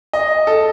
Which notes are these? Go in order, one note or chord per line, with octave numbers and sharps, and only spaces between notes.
D#5
A4